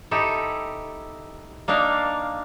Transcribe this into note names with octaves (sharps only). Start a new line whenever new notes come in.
D#4 E4 G4 A4
A#3 D4 D#4 F5